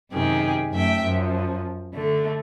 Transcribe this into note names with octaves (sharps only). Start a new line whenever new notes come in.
F#2 C3 D#3 G4 G#4
F#2 A3 E5 G5
F#2 F3
D3 A3